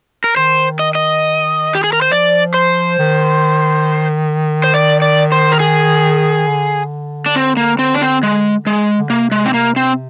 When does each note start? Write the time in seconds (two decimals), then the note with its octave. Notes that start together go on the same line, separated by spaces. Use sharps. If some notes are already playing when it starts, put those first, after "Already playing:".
0.24 A#4
0.36 D#3 C5
0.79 D#5
0.95 D#5
1.75 G4
1.84 G#4
1.93 A#4
2.02 C5
2.11 F3 D5
2.54 C5
2.99 D#3
4.64 C5
4.74 D5
5.02 D5
5.32 C5
5.52 A#4
5.60 G#4
6.48 D3
7.26 D4
7.36 C4
7.57 A#3
7.79 C4
7.95 D4
8.02 C4
8.23 G#3
8.67 G#3
8.98 D3
9.10 C3 A#3
9.31 G#3
9.45 C4
9.54 A#3
9.76 C4